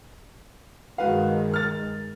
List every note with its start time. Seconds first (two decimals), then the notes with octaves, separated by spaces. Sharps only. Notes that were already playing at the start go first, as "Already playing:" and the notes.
0.98 G2 D#3 G#3 F#4 B4 F5
1.54 F6 A6